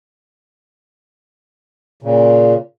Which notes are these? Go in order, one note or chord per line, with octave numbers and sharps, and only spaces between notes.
A#2 C#3